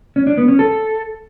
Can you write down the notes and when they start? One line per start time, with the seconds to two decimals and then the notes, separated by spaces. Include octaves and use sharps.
0.16 C#4
0.27 D4
0.38 B3
0.48 C#4
0.59 A4